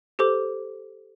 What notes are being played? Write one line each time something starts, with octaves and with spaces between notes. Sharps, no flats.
G4 A4 C5 D6